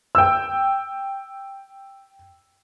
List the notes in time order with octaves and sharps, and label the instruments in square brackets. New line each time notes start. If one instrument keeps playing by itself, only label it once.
[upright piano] G5 E6